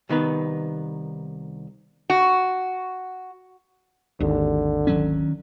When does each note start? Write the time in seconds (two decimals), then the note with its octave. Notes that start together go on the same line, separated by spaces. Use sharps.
0.09 C2 D#3 B3 B4
2.10 F#4
4.20 G#1 D#2 D3
4.87 D#3 F#3 C#4